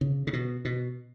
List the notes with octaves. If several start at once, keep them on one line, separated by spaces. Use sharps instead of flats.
C#3
C#3
B2
B2